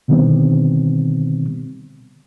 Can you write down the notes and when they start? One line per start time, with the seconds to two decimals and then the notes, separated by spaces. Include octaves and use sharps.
0.08 B2 D3 D#3 G3 B3 C4